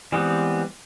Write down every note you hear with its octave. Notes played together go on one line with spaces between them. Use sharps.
E3 G3 G#3 B3 C4